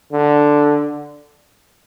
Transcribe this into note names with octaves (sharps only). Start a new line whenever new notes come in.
D3